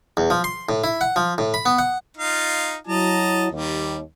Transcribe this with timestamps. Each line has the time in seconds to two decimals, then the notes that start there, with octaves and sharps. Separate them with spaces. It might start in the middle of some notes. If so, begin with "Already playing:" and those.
0.17 E2
0.30 F3
0.44 C6
0.69 A2
0.84 E4
1.01 F#5
1.16 F3
1.38 A2
1.54 B5
1.66 B3
1.79 F#5
2.17 D#4 F4 F5
2.87 F#3 E4 D#5 A5 A#5
3.52 D#2 D#3 G3